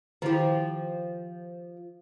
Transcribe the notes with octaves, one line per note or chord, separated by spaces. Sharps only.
D#3 F3 E4 G4